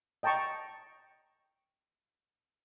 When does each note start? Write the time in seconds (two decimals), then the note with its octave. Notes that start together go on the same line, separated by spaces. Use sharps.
0.23 D#5 G5 A5 A#5 C#6